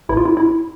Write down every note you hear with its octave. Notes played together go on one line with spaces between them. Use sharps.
A1 A2 E3 E4
F4
E4
E4